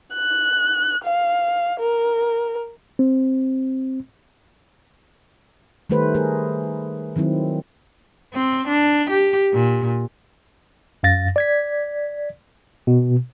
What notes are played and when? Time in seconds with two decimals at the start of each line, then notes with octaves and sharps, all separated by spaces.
0.14 F#6
1.04 F5
1.80 A#4
2.99 C4
5.90 D#3 G3 A3 G4 B4 C5
6.15 A3 G#4 A#4
7.16 D#3 F#3 C4 E4
8.34 C4
8.67 D4
9.09 G4
9.53 A#2
11.03 F#2 F5 A6 A#6
11.36 D5 G#6 B6
12.87 B2